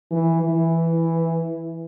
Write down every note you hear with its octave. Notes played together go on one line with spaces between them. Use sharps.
E3
E3